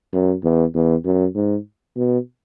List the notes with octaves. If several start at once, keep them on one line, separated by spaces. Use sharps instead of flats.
F#2
E2
E2
F#2
G#2
B2